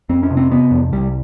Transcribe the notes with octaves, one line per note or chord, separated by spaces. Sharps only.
F2 C4
C#4
C3
C4
C3 B3
F2
C2 G3